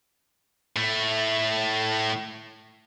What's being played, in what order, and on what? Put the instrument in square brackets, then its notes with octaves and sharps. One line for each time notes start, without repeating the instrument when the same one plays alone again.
[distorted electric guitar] A2 A3